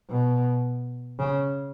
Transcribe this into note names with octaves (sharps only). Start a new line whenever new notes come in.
B2
C#3